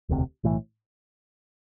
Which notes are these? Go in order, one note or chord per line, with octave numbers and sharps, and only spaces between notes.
E1 D2 C3
B1 A2 E3